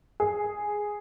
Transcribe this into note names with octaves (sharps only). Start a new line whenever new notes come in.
G#4